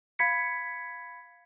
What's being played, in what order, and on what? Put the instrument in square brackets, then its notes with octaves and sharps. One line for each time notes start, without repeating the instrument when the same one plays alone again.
[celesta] F5 B5 G#6 B6 C#7